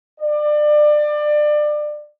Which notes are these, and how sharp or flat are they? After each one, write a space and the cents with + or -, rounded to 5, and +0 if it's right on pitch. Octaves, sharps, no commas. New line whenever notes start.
D5 +25